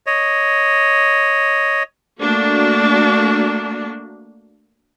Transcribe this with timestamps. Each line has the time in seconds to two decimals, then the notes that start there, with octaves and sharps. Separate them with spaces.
0.07 C#5 D#5
2.19 A3 A#3 D4 F#4